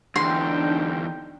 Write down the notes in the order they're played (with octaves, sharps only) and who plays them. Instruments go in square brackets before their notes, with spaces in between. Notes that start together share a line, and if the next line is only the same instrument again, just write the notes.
[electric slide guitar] E2 D3 [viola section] D4 D#4 G5 [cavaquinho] C6